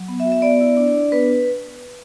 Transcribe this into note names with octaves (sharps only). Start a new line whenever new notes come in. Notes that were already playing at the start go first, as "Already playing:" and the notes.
Already playing: F#3
B3
E5
F#4
E5
B3 D5
E4
D4
D4
B3 B4